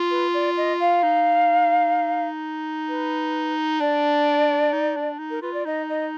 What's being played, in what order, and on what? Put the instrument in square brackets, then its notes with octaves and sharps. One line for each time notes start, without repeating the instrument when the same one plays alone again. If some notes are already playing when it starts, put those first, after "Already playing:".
Already playing: [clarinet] F4
[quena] B4
D5
D#5
F5
[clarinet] D#4
[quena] B4
[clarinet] D4 [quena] D5
[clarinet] D#4
D4
D#4
[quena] A#4
[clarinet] F4 [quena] B4
[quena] D5
[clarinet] D#4 [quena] D#5
[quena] D#5